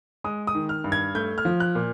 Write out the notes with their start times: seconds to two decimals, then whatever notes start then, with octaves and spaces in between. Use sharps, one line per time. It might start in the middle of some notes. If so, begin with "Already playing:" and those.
0.24 G#3 D#6
0.47 D#6
0.55 D#3
0.69 F6
0.84 G2
0.92 G#6
1.15 A3 G6
1.38 F6
1.45 F3
1.60 F#6
1.75 A#2